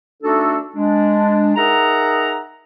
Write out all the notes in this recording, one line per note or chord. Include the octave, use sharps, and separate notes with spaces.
A3 D4 D#4 F#4 A4
G#3 D4
D#4 G#4 A#4 E5 F#5 A#5